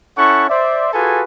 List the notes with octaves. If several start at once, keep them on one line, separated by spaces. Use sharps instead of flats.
C#4 E4 A4 F#5 C#6
C5 D5 E5
F4 F#4 G#4 A4 B4 G#5